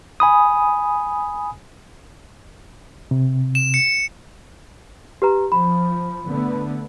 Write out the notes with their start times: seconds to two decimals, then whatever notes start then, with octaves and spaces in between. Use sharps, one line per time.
0.20 G#5 B5 D#6
3.11 C3
3.55 E7
3.74 C#7
5.22 G4 B4 A#5
5.52 F3 B5
6.27 D3 A3 B3